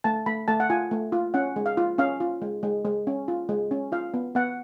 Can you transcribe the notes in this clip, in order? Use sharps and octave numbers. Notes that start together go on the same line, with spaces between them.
A3 A5
A3 B5
A3 A5
F#5
F4 G#5
A3
F4
C#4 F#5
G#3
F5
F4
C#4 F5
F4
G#3
G#3
G#3
C#4
F4
G#3
C#4
F4 F5
B3
B3 F#5